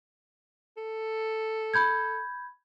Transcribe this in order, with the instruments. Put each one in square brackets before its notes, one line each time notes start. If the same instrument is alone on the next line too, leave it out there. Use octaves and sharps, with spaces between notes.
[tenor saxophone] A4
[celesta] B5 G6 G#6